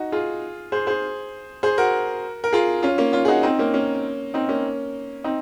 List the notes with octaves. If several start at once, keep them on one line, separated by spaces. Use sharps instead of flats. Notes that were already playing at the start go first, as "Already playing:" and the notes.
Already playing: D#4 F#4
F4 G#4
G#4 C5
G#4 C5
G#4 C5
F#4 A#4
A#4
F4 G#4
C#4 F4
A#3 C#4
C#4 F4
G#4
D#4 F#4
C4 D#4
A#3 C#4
A#3 C#4
C4 D#4
A#3 C#4
C4 D#4